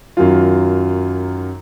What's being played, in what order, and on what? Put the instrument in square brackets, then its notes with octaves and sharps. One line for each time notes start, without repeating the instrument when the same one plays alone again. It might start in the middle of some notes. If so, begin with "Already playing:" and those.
[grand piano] F#2 D#3 F#3 F4